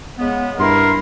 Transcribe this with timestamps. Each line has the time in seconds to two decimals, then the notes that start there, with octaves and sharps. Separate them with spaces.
0.17 C#3 G#3 B3
0.59 G2 E4 A#4 C6